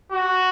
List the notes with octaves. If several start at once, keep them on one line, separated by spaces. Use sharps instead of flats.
F#4